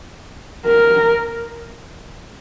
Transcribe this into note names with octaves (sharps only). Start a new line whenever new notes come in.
A#4